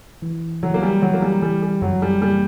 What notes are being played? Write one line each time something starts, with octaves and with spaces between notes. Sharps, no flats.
E3
E3 F#3
A#3
G3
E3 F#3
A#3
G3
E3 G3
G3
F#2 F#3
G3
G3 A#3